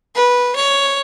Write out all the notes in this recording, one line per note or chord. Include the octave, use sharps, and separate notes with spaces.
B4
C#5